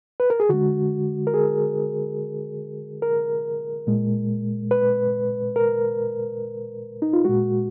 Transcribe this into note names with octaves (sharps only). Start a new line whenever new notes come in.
B4
A#4
G#4
D3 G#3 F#4
A#4
G#4
A#4
A#2 G#3
B4
A#4
D#4
F4
A#2 G#3 F#4